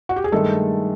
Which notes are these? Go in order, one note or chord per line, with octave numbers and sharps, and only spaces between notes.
F#4
G4
G#4
G2 D#3 G#3 A3 A4